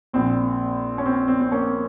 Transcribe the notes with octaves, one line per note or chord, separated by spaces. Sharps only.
A#1 A#2 C4
C#4
C4
C4
C4
A#3 C#4